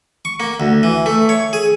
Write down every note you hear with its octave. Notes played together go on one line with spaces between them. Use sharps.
C#6
A#3
D2
E3
A3
C#5
G#4